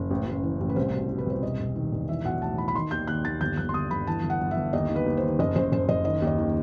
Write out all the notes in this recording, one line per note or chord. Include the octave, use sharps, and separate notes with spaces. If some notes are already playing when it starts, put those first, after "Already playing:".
Already playing: F#1
A1
A1
E3
A1
B4
C2 C5
B2
B2
B4
C2 C5
E1 D#5
E1
D#3
E1
E3 E5
B1 F#5
A2 A5
E3 B5
B5
D#3 C6
D#2 G6
D#2 F#6
D#2 A6
G1 G6
G1 F#6
C6
G1 D#6
G1 B5
E3 A5
G1
F#5
G1
E5
G1
D#2 D#5
D#3
B4
D#2
C5
D#3
F#1 D#5
F#1 C5
F#1 C5
F#1 D#5
D#3 D#5
D#2
D#5
D#3